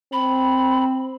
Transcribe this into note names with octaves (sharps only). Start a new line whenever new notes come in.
C4 B5